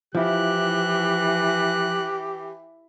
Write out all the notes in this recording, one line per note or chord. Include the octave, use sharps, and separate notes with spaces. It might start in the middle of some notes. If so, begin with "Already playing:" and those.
E3 F3 E4 G4 F#6